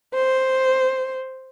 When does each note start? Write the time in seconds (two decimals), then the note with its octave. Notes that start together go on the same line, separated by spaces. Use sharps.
0.14 C5